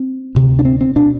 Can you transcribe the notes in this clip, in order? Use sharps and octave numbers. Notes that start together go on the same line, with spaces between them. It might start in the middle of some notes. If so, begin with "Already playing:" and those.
Already playing: C4
D2 C3
D4
C4
C4
B2 D4